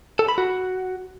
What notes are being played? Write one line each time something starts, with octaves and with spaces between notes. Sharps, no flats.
A4
B5
F#4